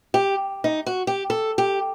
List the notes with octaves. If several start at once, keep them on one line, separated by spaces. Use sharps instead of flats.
G4
D#4
F#4
G4
A4
G4